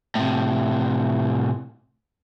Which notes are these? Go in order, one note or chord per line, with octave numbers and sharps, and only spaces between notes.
A2 C3